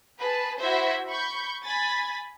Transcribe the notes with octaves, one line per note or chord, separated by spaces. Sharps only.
G#4 B4 A5
E4 F#4 C5 E5
B5 C#6 G6
G#5 B5 A6